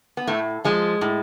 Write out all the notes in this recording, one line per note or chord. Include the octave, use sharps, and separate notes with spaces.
B3
A2 A3
F3 G#3
A2